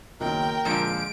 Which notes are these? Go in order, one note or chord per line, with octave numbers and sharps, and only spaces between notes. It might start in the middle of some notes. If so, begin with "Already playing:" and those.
F#1 B1 D#3 A#4 G5
A#2 D3 F3 G#3 D7